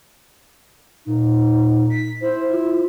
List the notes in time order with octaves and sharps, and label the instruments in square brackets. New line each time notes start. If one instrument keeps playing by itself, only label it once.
[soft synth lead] A#2 [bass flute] D#4
[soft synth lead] B6
[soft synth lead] E4 [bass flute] C5
[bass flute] F4